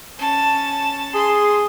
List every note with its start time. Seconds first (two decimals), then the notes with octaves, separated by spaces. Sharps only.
0.19 C#4 A5
1.14 G#4 C6